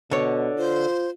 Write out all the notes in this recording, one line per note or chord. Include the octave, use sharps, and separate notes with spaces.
B2 D3 C#5
F4 C5